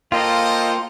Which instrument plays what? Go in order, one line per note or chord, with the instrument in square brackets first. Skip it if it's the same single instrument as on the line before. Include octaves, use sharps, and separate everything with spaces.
[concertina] A#3 G5 [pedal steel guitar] F4 [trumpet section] A4 C5 D#5